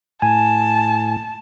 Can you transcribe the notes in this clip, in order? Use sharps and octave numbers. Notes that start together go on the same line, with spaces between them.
A2 G#5 A5